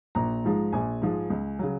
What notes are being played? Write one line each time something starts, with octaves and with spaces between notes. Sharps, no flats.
A#1 A#5
G#2 F3 G#3
A#1 G#5
G#2 F3 G#3
C#2
C#3 F#3